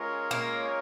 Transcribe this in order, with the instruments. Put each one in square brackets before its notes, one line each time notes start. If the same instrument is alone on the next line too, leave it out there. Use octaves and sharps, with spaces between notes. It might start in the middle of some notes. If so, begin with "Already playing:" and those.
Already playing: [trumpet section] G#3 C#4 F4 A#4 C#5
[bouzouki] A#3